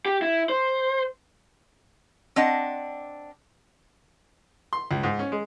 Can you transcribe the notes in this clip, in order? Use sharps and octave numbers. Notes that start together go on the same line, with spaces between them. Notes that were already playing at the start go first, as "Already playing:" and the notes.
G4
E4
C5
C4 D4 D#5 F#5
C6
C#2
G#2
C#4
G#3